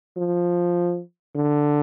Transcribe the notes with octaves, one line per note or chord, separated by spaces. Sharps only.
F3
D3